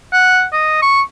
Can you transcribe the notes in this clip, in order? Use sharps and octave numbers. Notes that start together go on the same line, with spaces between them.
F#5
D#5
C#6